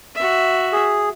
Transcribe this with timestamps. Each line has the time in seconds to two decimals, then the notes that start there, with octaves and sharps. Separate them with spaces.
0.15 F#4 E5
0.73 G#4